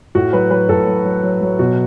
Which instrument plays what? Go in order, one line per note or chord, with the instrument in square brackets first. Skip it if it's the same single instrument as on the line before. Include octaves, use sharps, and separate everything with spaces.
[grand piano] A2 F#4
F#3 B4
F#3 B4
A2 A4
F#3
F#3
F#3
F#3
B2 F#4